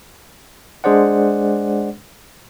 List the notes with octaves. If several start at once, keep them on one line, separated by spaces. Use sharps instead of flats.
G#3 D4 G#4 C5 D5 F#5